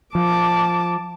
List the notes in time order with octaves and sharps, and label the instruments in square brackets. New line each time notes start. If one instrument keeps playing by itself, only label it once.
[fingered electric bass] F3 [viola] A5 D6